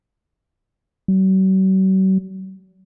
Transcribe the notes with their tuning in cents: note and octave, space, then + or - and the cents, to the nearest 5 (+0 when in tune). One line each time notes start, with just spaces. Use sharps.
F#3 +45